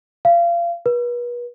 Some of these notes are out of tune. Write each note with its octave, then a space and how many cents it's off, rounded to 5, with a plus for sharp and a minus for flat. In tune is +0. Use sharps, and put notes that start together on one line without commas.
F5 -30
B4 -40